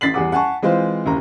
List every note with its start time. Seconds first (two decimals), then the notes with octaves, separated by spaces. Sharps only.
0.01 A1 A6 B6 C7 F#7
0.14 E2 G3 G#4 F#5 D6
0.32 F#5 G#5 A5 C#6
0.62 E3 G#3 C4 F4 C5
1.06 F#1 D#2 A#5